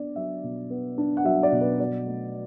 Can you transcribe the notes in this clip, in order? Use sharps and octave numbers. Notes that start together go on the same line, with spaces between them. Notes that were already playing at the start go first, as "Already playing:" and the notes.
Already playing: B3 D4 D5
F#3 E5
B2
B3
D4
F#5
F#3 E5
D5
B2
B4
F#3 D5
A3